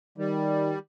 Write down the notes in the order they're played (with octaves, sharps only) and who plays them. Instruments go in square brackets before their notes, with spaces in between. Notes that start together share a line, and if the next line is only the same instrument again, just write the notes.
[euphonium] D#3 [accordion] G3